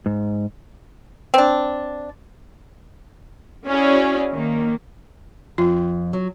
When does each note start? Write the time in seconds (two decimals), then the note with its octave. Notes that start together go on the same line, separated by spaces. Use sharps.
0.06 G#2
1.34 C4 D4
3.67 C#4 E4 F#4 G#4 C#5 D5
4.32 D#3 A#3
5.58 F2 F4
6.13 F#3